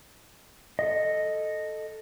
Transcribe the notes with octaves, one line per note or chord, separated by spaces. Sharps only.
A4 D#5